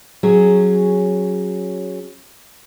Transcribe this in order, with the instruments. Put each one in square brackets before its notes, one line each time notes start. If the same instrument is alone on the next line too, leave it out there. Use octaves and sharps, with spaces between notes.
[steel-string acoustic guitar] F#3 C#4 G#4